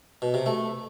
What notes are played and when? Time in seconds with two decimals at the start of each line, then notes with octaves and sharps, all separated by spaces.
0.22 B2
0.34 C3
0.46 A3